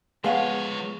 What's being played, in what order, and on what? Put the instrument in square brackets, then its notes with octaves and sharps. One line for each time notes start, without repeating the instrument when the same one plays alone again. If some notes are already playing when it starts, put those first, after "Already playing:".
[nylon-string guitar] C#3 F5 F#5 [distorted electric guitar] F3 C#5 [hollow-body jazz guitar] G#3 B3